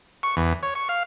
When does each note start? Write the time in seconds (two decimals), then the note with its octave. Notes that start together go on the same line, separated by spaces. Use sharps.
0.23 C#6
0.37 E2
0.63 C#5
0.75 C#6
0.89 F5